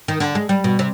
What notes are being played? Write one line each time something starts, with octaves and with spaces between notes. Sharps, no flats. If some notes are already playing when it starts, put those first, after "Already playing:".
D#3
D3
G#3
G3
B2
C3